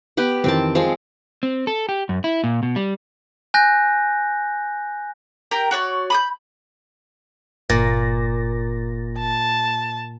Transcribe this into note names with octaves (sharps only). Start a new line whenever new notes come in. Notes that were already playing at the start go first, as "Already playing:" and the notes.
B3 G4 B4
F2 D#3 E3 C4 G5 A5
F3 G#3 C4
C4
A4
G4
F#2
E4
A#2
B2
G3
G#5 F#6 G6 A#6
G4 A#4 G5
F#4 C#5 D5
B5 D#6 G6
G1 A#2 A6 A#6
A5